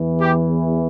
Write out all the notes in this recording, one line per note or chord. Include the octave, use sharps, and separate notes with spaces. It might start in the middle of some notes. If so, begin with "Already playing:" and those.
Already playing: E2 E3
G4